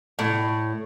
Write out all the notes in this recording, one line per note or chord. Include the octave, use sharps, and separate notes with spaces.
A2